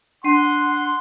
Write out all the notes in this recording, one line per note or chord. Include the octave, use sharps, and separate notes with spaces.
D4 F#5 C6 C7 D#7